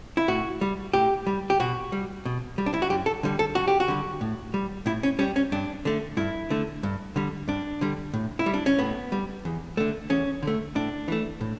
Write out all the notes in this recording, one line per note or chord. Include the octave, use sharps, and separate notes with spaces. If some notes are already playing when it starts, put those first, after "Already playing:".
E4
A2 F#4
G3
A2 G4
G3
G4
B2 F#4
G3
B2
G3
D4
E4
F#4
F#2 G4
A4
D3 G3
A4
F#2 F#4
G4
F#4
D3 G3
A2
G3
A2 E4
C#4
G3 C#4
C#4
G2 D4
D3 A3
G2 E4
D3 A3
G2
D3 G3
G2 D4
D3 G3
A2
E4
G3
D4
C#4
A2 B3
G3
E2
D3 A3
E2 C#4
D3 A3
A2 D4
E3 A3
A2